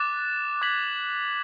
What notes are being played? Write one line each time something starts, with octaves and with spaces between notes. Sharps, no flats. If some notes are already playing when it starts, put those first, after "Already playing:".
Already playing: D6 F#6 A6 E7
D6 G#6 B6 F#7